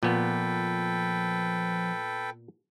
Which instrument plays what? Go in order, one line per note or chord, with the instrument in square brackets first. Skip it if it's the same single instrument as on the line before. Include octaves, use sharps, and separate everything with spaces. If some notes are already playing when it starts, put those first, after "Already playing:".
[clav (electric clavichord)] A#2 B3 [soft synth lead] F3 [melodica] A4 B4 G5